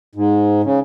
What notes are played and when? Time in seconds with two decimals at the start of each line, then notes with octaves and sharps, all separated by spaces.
0.15 G#2
0.63 C#3